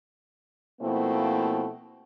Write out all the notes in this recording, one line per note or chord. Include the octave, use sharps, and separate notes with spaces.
B2 F3 A3 A#3 C4 E4